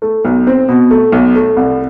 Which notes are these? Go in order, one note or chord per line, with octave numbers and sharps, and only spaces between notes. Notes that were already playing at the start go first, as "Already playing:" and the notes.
A3
B1
C4
B2
A3
B1
A3
C2